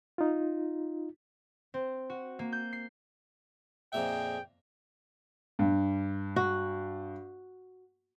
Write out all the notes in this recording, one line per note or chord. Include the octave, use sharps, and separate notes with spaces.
D#4 F4
C4
F#4
A#3
G6
C7
F2 A#2 G#4 C5 E5 G5
G2
F#4